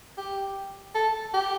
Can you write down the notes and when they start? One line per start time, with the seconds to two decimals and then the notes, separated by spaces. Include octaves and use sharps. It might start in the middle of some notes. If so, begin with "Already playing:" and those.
0.17 G4
0.95 A4
1.34 G4